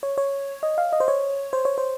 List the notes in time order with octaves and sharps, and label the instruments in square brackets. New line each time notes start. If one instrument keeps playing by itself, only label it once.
[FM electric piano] C#5
C#5
D#5
F5
D#5
C5
C#5
C5
C#5
C5